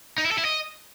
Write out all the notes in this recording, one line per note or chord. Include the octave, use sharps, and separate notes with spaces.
D#4
E4
A4
E4
D#5